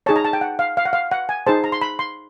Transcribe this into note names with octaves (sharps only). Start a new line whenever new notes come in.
D#4 G#4 C#5 A5
A#5
A5
G5
F#5
F5
F5
F#5
F5
F#5
G#5
D#4 G#4 C5 A5
A#5
C6
B5
C6